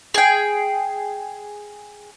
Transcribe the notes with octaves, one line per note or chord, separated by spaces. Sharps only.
G#4 G5